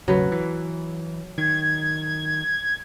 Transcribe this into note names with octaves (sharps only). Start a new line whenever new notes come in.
E1 A1 C#3 F#3 B4
E3
D#3 G#6